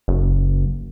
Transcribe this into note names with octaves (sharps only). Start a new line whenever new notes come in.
F#1